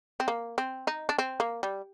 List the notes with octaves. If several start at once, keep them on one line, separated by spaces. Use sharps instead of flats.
C4
A#3
C4
D#4
D4
C4
A#3
G3